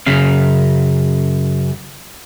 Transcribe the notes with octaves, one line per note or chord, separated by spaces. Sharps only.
F#2 C#3 F5